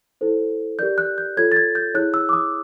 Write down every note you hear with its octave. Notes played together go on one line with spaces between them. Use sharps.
E4 A4 C5
G4 A#4 D5 G6
F#6
G6
F4 A4 C#5 G#6
A6
G#6
G6
E4 G#4 C#5 F#6
E6
D6
D#6